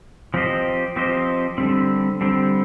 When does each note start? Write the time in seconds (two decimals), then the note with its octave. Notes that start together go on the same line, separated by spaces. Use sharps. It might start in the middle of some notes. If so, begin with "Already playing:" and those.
0.34 F3 C4 G4 C5 D#5
0.96 F3 C4 G4 C5 D#5
1.58 D3 G3 C4
2.21 D3 G3 C4